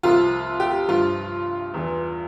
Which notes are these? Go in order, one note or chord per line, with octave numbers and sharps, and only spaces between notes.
C2 C3 F3 F4
G4
G2 F3 F4
E2 E3